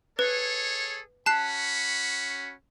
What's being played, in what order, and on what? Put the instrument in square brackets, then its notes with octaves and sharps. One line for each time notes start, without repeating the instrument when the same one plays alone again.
[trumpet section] G#4 A4 C#5 [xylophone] B4
[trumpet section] C#4 F#4 B5 [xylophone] A5 F#6 C7